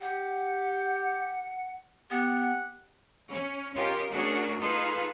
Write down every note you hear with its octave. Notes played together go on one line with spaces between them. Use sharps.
G4 F#5
B3 G4 F#5
C#4
C#4 F4 G4 A#4 D#5
A3 C#4 D4 F#4 G#4 A#4
D#4 F4 G#4 A4 B4